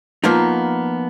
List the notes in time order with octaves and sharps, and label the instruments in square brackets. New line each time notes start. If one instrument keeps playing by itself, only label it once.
[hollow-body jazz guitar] F3 A#3 B3 D#4